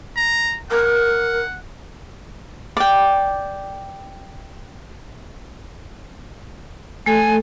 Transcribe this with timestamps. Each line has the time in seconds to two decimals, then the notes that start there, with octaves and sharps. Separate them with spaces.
0.17 A#5
0.71 A#4 F#5
2.77 D5 G5
7.06 A3 A4 G#5